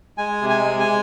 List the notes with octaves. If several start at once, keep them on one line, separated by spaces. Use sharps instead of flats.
G#3 G#5
C3
G#5
G#3
G#5